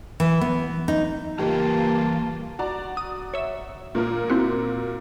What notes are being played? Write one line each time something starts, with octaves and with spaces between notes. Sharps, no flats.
E3
B3
D#4
E3 A#3 F4 G4 A#4 B4 A5
F#4 D5 A#5
D#6
C#5 E5
A#2 A#3 A#4
C4 E4 F#4